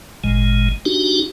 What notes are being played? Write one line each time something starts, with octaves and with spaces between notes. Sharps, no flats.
G#1 A#2 G#3
D4 D#4 F#4 G4